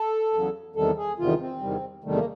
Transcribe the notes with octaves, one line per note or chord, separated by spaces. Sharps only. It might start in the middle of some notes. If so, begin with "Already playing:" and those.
Already playing: A4
E2 C#3 F#3
E2 C3 D#3 G3 A4
G#4
E2 C3 D#3 G3 F4
C4
E2 C3 D#3 G3
E2 C3 D#3 G3 A3
A#3